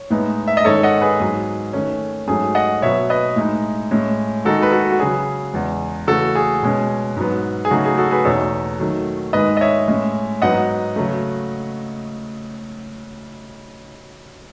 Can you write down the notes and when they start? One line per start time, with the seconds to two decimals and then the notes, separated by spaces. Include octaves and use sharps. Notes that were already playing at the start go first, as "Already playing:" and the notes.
Already playing: C#5
0.10 A2 G#3 B3 D#4
0.48 E5
0.57 D#5
0.65 G#2 D#3 G#3 C#4 A4 C#5
0.83 D#5 F#5
1.01 G#4 B4
1.20 G#2 F#3 B3
1.73 D#3 A3 C#4
2.28 G#2 F#3 A3 C#4 G#4
2.55 D#5 F#5
2.82 B2 F#3 B3 C#5 E5
3.10 B4 D#5
3.36 A2 G#3 D#4
3.91 A2 G#3 C#4
4.45 D#3 G#3 D#4 F#4 A4
4.62 B4
4.72 F#4 A4
4.92 F#4
4.99 C#3 F#3 C#4 G#4
5.54 E2 C#3 G#3
6.07 C#3 E3 A3 F#4 A4
6.35 G#4
6.63 B2 G#3 C#4
7.16 G#2 F#3 B3
7.65 G#4
7.71 C#3 F#3 A3 D#4 F#4
7.85 G#4
7.98 F#4 A4
8.11 G#4 B4
8.25 E2 B2 A3 D#4 A4 C#5
8.80 D#3 F#3 A3
9.33 G#2 D#3 G#3 B4 D#5
9.57 D#5
9.61 C#5 E5
9.88 A2 G#3 C#4
10.42 G#2 F#3 B3 D#4 D#5 F#5
10.96 C#3 F#3 A3